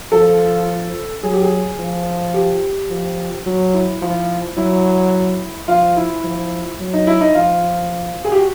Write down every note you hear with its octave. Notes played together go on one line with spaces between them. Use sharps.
F3 A4
F#3 G#4
G4
G#4
F3
G4
F3
F#3 F#4
E4
F3
F#3 E4
F3 F4
E4
F3
F#3
D#4
E4
D#4
F3 F4
G#4
G4
F#4